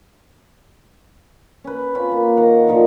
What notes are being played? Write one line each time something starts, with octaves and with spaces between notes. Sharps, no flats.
C#4 B4
C4 C#4 F4 B5
A#3
D#3 A#4 F#5
A#2 D3 D#3 F3